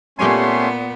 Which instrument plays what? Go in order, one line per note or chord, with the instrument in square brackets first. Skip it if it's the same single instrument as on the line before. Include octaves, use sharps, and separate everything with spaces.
[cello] A#2 B3 [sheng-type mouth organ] A3 C#4 C6 [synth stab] G4 C#5 G#5